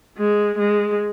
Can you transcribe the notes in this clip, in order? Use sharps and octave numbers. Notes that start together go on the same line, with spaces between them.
G#3
G#3